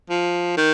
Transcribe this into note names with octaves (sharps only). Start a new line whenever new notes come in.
F3
D#3